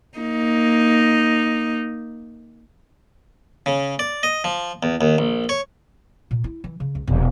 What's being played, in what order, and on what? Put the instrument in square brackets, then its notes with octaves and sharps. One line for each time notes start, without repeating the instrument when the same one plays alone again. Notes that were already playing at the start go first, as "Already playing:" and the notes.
[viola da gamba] A#3 D#4
[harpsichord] C#3
D5
D#5
F3
E2
D#2
A#1
C#5
[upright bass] A#2
E4
E3
C#3
C#2
E1